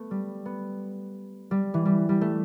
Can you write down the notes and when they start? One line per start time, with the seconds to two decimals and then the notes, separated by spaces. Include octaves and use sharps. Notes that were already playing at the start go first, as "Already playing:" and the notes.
Already playing: A3 B3
0.11 G3
0.45 B3
1.51 G3
1.74 E3
1.85 G3
2.09 G3
2.21 A3